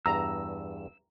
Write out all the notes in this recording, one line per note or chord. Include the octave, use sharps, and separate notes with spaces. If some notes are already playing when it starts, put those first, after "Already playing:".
E2 G2 A#5 E6